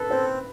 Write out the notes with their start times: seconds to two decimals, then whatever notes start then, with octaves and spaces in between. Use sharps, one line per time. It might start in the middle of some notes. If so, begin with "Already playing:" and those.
Already playing: A4 B4
0.10 C4 C5